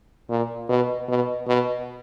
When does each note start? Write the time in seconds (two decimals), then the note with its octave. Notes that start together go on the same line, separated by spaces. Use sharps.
0.30 A#2
0.69 B2
1.08 B2
1.47 B2